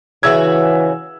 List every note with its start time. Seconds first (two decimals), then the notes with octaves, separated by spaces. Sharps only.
0.23 C#3 E3 C#4 F#4 E5 E6 G#6